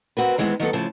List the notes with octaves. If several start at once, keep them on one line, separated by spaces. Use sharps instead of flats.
C4 F#4 A#4 B4
D#3 E3 G#3 A3 B3 C4
D#3 F#3 B3 A4
A2 C#3 F3 A5